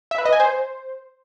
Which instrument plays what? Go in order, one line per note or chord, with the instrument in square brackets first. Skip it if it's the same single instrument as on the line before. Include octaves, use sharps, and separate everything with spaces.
[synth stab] E5
B4
D#5
G#5
C5